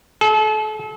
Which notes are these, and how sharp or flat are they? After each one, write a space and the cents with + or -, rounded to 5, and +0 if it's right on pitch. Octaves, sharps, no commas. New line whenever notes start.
A4 -40